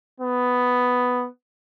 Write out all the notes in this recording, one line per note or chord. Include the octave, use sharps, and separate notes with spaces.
B3